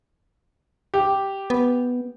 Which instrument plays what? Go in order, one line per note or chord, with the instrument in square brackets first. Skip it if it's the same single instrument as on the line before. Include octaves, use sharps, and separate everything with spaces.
[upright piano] G4
[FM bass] B3